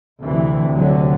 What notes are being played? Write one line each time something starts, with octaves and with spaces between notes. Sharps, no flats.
D2 C3 E3
D3 F#3